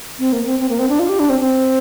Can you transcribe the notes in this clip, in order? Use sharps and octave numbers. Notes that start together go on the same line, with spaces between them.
C4
A#3
C4
C4
A#3
C4
D4
F4
G4
D4
C4
C4